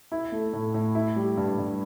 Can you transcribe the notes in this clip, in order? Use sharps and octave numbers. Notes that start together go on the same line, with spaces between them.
E4
A3
A2
A2
E4
G3
G2
G2